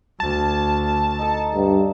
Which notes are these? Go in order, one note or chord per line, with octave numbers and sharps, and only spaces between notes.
D2 A5
D#4 A4
G2